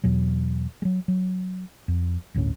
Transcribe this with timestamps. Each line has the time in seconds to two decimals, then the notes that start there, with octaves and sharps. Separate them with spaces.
0.04 E2 B2 F#3
0.82 F#3 G#3
1.08 F#3
1.88 F2
2.34 G1 D2 A2 C#4